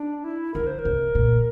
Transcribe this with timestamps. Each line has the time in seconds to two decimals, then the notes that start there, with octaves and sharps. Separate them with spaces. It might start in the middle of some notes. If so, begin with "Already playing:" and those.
Already playing: D4
0.24 E4
0.54 D3 A#4
0.67 C5
0.79 A#4
0.85 C3
1.15 A#2